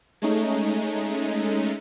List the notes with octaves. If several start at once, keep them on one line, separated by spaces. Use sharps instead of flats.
G#3 A3 C#4 D#4